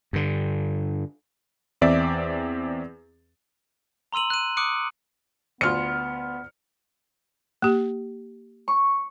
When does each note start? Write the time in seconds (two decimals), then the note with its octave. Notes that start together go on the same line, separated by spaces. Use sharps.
0.13 G2 D3
1.81 E2 C4 D5 E5 D6
4.12 A#5 C6 E6 D#7 F#7
4.30 F#6 D#7
4.57 D6 D#6 F#6 C#7 D7
5.61 D2 B3 F4 F6 C#7
7.62 A#3 G4
8.68 C#6